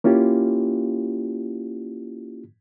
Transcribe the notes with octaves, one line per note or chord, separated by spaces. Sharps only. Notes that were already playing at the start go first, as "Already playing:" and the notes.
A#3 C#4 E4 F4 G4